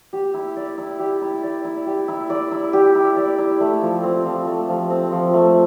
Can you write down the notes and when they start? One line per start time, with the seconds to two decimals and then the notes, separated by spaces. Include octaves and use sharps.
0.13 G4
0.34 E4
0.56 D5
0.77 E4
1.00 G4
1.21 E4
1.43 D5
1.65 E4
1.86 G4
2.08 E4
2.30 D5
2.51 E4
2.73 G4
2.95 E4
3.16 D5
3.38 E4
3.60 A3
3.82 F3
4.03 C4
4.25 F3
4.47 A3
4.69 F3
4.90 C4
5.12 F3
5.34 A3